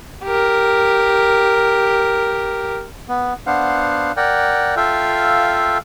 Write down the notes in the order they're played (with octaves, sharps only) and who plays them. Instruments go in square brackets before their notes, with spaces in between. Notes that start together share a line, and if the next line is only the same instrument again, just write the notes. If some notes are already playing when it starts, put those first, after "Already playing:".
[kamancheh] G4 A#4
[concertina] B3
B3 D4 C5 F5 F#5
A#4 D5 F#5 G5
F4 A4 E5 F5 G5